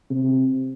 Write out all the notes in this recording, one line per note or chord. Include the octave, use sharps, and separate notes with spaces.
C3